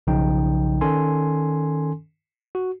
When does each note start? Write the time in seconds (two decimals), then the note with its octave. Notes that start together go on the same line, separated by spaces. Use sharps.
0.07 B1 C#3 F3 D#4 G5
0.81 D#3 C#4 A4 G#5 C6
2.55 F#4